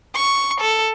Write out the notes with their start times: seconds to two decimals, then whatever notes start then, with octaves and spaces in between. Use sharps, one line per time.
0.16 C#6
0.61 A4